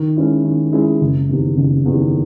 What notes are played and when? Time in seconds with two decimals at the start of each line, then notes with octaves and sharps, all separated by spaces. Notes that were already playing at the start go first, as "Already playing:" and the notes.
Already playing: D#3
0.16 G#3 C#4 E4
0.44 D#3
0.73 G#3 C#4 E4
1.01 F#1
1.29 E2 C3 D#3
1.57 F#1
1.85 E2 C3 D#3